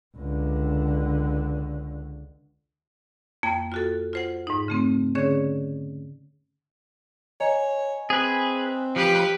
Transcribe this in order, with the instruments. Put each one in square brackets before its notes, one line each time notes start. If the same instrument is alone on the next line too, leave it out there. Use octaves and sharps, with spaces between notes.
[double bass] C#2 D3
[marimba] F2 A#3 G5 A5
F4 F#4 A4
F4 C5 F#5
G#2 D#4
C#3 A3 C4
D3 C#4 G#4 C#5
[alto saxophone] C#5 [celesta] D#5 G#5 A#5
[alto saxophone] C4 [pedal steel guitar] G#4 B4
[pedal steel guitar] F3 [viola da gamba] G4 B4